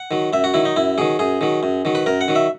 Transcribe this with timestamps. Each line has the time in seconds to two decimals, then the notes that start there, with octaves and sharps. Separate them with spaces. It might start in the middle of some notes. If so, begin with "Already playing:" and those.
Already playing: F#5
0.11 D#3 F#3
0.33 F#2 E5
0.44 F#4
0.54 D#3 F#3 E4
0.65 D#4
0.76 F#2 E4
0.98 D#3 F#3 G#4
1.19 F#2 G#4
1.41 D#3 F#3
1.63 F#2
1.85 D#3 F#3
1.95 B4
2.06 F#2 A#4
2.21 F#5
2.28 D#3 F#3
2.36 E5